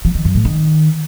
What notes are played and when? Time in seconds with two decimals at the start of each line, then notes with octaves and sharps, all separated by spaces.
0.05 F3
0.15 D#3
0.25 F#2
0.35 A2
0.45 D#3